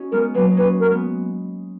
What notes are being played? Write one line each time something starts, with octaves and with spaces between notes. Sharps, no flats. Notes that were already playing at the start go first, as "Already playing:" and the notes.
Already playing: C#4 D#4 F#4
G#3 B3 A#4
F#3 A#3 B4
D#4
A#3 C#4 B4
A#4
G#3 B3